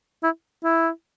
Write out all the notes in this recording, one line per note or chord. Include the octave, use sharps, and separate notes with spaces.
E4
E4